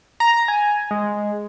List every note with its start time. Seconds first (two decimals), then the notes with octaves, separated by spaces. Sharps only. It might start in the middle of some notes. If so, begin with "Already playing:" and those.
0.20 A#5
0.48 G#5
0.91 G#3